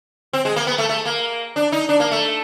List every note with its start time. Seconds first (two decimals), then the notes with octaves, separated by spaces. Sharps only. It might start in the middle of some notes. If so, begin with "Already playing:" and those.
0.33 C4
0.45 G#3
0.56 A#3
0.67 B3
0.78 A3
0.89 A3
1.05 A#3
1.56 D4
1.72 D#4
1.89 D4
2.00 A#3
2.11 A3